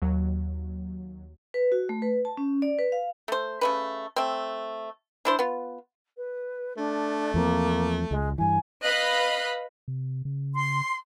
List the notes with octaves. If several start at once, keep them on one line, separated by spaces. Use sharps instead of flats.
D#2 F#3
B4
F#4
A3
B4
A5
C#4
D5
B4
F5
A3 C5
C#3 A3 B4
A3 C4
D4 E4 C5
B3 F4
B4
A3 D4
E2 F3 A#3 C4
C#2 G#3
G2 E3 G#5
B4 D#5 F5 B5 F#6
C3
C#3
C6